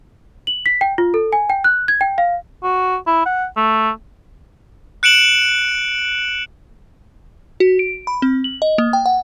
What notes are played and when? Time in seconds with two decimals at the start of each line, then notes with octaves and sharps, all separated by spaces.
0.47 F#7
0.66 B6
0.81 G5
0.98 F4
1.14 A4
1.32 G#5
1.50 G5
1.64 F#6
1.88 G#6
2.01 G5
2.18 F5
2.63 F#4
3.07 E4
3.26 F#5
3.56 A3
5.03 F#6 C#7 D7 E7 F#7
7.60 F#4
7.79 D7
8.07 B5
8.22 C4
8.44 F#7
8.62 D#5
8.78 A#3
8.93 G5
9.06 F#5